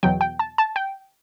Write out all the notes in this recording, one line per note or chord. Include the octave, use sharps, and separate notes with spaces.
E2 B2 F#3 G5
G5
A5
A5
G5